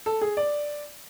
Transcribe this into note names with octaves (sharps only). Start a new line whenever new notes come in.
A4
G#4
D5